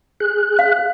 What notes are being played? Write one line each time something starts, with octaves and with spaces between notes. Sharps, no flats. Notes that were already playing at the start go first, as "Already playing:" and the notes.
G#4 F#6
F5